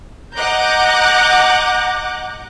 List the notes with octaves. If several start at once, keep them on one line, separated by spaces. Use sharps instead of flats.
D#5 F#5 A#5 D6 F#6 G6